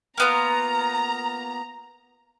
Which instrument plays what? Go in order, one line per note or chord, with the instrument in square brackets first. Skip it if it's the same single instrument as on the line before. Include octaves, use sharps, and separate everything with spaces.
[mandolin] A#3 B3 F4 [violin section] A#5